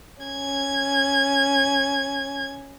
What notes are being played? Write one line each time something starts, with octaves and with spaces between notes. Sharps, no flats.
C#4 G#6